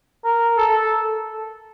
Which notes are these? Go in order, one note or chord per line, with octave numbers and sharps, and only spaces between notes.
A#4
A4